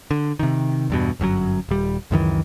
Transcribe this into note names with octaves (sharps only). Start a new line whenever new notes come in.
D3
C3 D#3
E2 G2 B2
G1 F#2 D3 F#3
D#1 G3
C#2 F#2 D#3 E3